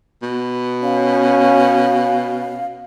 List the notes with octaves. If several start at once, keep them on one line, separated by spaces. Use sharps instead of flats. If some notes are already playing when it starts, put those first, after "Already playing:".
B2
C#4 F5